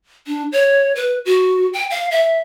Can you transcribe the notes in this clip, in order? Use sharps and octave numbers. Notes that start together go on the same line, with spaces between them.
D4
C#5
B4
F#4
G5
F5
E5